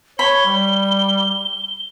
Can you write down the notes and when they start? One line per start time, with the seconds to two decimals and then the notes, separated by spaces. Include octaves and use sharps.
0.19 C#5 B5 G7
0.45 G3